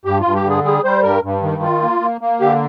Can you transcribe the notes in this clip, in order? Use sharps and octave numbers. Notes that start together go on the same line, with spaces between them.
G2 G4
G2 F4
G4
D3 G#4
G3 G#4
G3 C5
G2 A#4
G2
D#3
F4
A#3
A#3
A#3
D3 G4